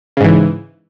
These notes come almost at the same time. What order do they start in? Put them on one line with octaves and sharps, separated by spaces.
C#3 G#2 E3